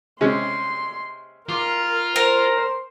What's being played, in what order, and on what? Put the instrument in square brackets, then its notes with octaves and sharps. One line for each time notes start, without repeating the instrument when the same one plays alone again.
[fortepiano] C3 G#3 C#4 [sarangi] C6
[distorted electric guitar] F4 [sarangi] A#4 [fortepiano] C6 D6
[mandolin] A#4 [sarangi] C5